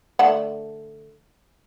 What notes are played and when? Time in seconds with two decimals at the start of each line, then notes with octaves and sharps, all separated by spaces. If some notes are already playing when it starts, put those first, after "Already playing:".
0.19 D3 A3 F#5